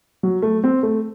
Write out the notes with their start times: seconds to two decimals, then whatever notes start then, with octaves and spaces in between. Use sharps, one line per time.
0.23 F#3
0.42 A3
0.64 C4
0.83 A3